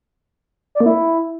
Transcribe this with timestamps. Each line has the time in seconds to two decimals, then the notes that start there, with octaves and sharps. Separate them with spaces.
0.75 D5
0.80 A#3
0.86 E4